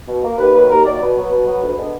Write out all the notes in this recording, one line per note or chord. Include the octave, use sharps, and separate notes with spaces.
B2
A#3
D#2 B4
D#3 F#3 A#3 B4
D#2 A#4
D#3 F#3 A#3 D5
B2 B4
F#3 B3
B2
F#3 B3
D2
D3 G#3 B3